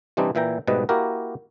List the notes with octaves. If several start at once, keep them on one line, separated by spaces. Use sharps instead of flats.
C3 E3 G3 C4 D4 D#4
A#2 E3 E5 G5 A#5
G#2 B2 G3 A3 B4 D#5
A#3 E4 F#4 G4 A#4